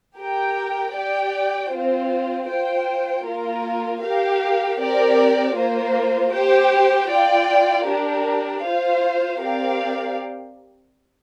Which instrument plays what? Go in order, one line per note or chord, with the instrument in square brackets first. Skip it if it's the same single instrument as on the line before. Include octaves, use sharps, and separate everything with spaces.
[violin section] G4 A#4 G5
G4 D5 G5
C4 F4 C5
F4 C5 G5
A#3 F4 A#4
G4 A#4 F5
C4 G4 A#4 D5
A#3 F4 C5
G4 C5 G5
F4 D5 G5
D4 G4 A#4
F4 C5 F5
C4 G4 A#4 D5 F5